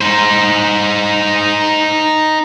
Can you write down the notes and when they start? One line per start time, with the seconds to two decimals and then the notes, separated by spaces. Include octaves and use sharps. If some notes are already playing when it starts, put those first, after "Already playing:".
0.01 D#4 C5